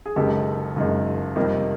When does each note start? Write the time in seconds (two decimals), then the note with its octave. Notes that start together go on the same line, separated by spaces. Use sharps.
0.06 G#4
0.16 F#1 F#2 D#3 G#3 G4 A4
0.76 F#1 F#2 D#3 G#3
1.36 F2 C3 D#3 G3 A#3